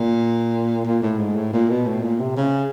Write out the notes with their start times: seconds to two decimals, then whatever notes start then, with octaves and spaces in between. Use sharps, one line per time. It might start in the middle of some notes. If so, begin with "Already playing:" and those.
Already playing: A#2
0.86 A#2
1.02 A2
1.19 G#2
1.36 A2
1.53 A#2
1.70 B2
1.86 A2
2.03 A#2
2.20 C3
2.37 C#3